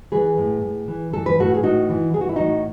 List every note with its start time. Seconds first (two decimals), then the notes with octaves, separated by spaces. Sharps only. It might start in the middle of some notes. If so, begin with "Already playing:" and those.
0.12 E3 G#4 B4
0.37 A2
0.62 A2
0.88 E3
1.13 E3 A4
1.26 B4
1.38 A2 F#4 A4
1.54 G#4
1.63 A2 D#4 F#4
1.89 E3
2.14 E3 G#4
2.21 F#4
2.29 E4
2.36 A2 D#4 F#4